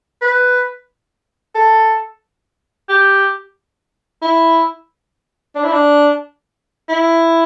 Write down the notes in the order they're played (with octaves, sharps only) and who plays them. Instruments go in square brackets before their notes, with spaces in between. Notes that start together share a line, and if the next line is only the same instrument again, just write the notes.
[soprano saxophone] B4
A4
G4
E4
D4
E4
D4
E4